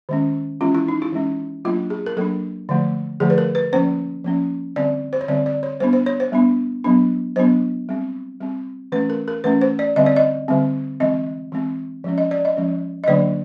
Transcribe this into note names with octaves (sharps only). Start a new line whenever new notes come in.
D#3 G#3 C#4
E3 G#3 C#4 F4
E4
D#4
E4
E3 G#3 C#4
F#3 A#3 D4 F4
G#4
A#4
F#3 A#3 D4 A4
D3 F3 A3
D3 F3 A3 G#4
B4
A#4
B4
F3 A#3 C#4 C5
F3 A#3 C#4
D3 G3 C4 D5
C5
C#5
D3 G3 C4 D5
D5
C#5
G3 B3 D4 C5
C5
C#5
C5
G3 B3 D4
F#3 B3 D4
F#3 B3 D4 C5
G3 C4
G3 C4
E3 A3 C#4 B4
A#4
A#4
E3 A3 C#4 B4
C5
D5
D3 G3 C4 D#5
D5
D#5
D3 G3 C4
E3 G#3 C4 D#5
E3 G#3 C4
F3 G#3 C#4
D#5
D5
D#5
F3 G#3 C#4
D#5
D3 F#3 A#3 D4 D5